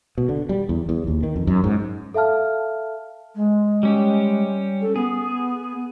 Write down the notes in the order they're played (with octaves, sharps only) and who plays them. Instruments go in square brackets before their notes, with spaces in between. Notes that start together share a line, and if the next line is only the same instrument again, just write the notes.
[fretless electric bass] B2
D3
G3
E2
E2
D#2
D#3
F2
F#2
G#2
[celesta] A4 E5 F5 A5 F6
[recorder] G#3
[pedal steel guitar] G3 C#4 G4
[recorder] A4
[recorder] B3 [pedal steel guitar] G#4